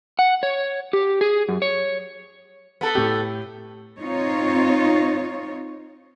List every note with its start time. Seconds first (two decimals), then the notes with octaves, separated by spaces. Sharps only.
0.19 F#5
0.43 C#5
0.93 G4
1.21 G#4
1.49 F#2
1.62 C#5
2.81 B3 A4
2.95 A2 G4
4.00 C4 D#4 F4 C#5